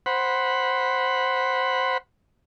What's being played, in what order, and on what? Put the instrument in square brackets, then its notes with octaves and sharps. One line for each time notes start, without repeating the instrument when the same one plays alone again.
[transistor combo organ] C5 F#5 B5